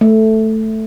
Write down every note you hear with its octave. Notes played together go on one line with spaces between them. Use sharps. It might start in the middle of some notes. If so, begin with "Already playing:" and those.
A3